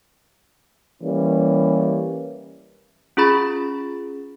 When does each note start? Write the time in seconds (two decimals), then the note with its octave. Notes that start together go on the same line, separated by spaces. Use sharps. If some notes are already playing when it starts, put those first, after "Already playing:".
1.03 E3 G3 A#3 C#4
3.17 C#4 F4 G#4 B5 A6